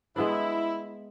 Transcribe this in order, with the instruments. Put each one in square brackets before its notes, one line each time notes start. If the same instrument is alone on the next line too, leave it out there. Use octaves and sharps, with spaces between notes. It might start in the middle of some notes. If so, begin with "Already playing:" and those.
[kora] G#3 B3 D4 [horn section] E4